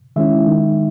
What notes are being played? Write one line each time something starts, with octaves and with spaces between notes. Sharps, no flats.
D#3 G#3 C#4 E4 E5
D#3 G#3 D#4